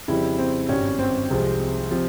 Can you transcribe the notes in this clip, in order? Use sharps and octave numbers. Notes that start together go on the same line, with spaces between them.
F2 C#3 G3 E4
C4
G#1 G2 G3 C#4
C4
C2 C3 F3 G#3
C3 F3